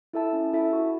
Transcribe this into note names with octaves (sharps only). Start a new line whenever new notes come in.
E4 A4 E5 A5
C#4
E4 A4 E5 A5
F#4